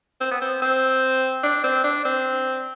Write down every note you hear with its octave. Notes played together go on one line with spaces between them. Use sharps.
C4
B3
C4
C4
D4
C4
D4
C4